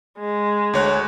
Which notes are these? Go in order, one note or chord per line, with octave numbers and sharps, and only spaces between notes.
G#3
D2 C#5 F#6